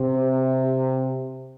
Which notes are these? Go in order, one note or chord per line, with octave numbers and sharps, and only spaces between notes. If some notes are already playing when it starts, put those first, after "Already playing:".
Already playing: C3